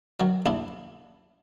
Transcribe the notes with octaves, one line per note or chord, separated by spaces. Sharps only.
D#3 F#3
D#2 D4 E4